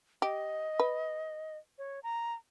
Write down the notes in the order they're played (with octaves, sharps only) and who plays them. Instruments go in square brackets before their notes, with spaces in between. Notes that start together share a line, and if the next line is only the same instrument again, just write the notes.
[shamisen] G4 [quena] D#5
[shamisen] B4
[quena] C#5
A#5